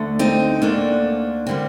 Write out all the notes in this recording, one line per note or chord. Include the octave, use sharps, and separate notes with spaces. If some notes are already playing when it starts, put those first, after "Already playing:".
Already playing: D2 D3 A3
C4 D#4
D2 D3 A3 A#3 D4
D3 G3 A#3 C4